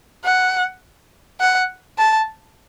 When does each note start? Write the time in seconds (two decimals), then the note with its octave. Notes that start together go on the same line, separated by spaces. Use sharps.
0.24 F#5
1.40 F#5
1.98 A5